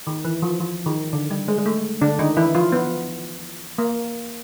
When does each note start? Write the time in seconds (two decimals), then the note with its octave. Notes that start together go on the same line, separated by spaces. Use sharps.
0.07 D#3
0.25 E3
0.42 F3
0.60 F3
0.86 D#3
1.13 D3
1.31 G3
1.48 G#3
1.58 G#3
1.66 A3
2.01 D3 D4
2.19 D#3 D#4
2.37 E3 E4
2.55 F3 F4
2.72 B3
3.78 A#3